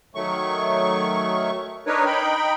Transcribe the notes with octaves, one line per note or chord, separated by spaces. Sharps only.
D#3 F#3 A3 C#6
D4 D#4 A#4 B4 C#5
D#4 G5 B5